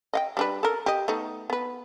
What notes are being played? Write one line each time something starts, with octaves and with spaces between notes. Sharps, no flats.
D#5 F5 G5
G3 D4 B4
A4 A#4
G4 D#5
A3 B3 D#4
B3 B4